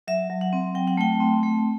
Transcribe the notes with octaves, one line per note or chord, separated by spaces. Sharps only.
F#3 E5
F#3
F#5
C4
F#3 G5
F#5
A3 G5
C4
A3